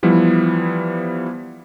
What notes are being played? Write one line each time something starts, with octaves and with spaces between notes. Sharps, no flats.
E3 F3 G3 B3 E4